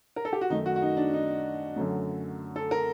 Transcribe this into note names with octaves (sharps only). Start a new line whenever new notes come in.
A#4
A4
G4
F#4
F#2 D#3 A3 D#4
F#4
F#4
D#4
D4
D#4
F#2 D3 F#3 A3
A4
A#4